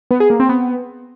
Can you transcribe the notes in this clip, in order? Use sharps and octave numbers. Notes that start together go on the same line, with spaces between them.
B3
G#4
A#3
C4
B3